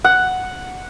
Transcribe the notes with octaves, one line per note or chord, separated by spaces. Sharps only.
F#5